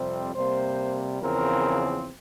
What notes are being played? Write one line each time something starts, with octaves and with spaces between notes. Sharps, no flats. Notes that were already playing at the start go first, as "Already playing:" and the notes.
Already playing: F2 C3 G3 C4
C3 G3 A#3 C5
E2 C#3 F3 C4 A#4